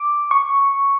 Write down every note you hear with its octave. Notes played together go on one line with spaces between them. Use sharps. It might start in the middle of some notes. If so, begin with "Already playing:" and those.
Already playing: D6
C#6